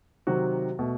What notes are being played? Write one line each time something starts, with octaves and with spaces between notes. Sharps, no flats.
C3 D#3 F#3 C4 F#4
B2 A3